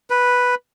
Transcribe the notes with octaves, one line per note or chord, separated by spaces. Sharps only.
B4